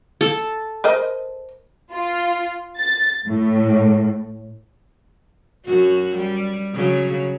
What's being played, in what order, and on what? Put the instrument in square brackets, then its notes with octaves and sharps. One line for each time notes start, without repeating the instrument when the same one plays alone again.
[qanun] A4
[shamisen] A#4 C5 D#5
[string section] F4
A6
A2
[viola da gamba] F#2 F#4
G3
C#3 F#3